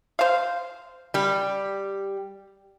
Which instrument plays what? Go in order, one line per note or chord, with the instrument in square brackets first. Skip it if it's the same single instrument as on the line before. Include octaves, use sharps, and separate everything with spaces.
[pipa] C5 F5
[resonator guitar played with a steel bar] G3 G4